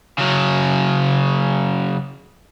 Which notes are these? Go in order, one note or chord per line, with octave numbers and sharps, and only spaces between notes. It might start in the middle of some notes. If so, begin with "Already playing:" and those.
C#3 F#3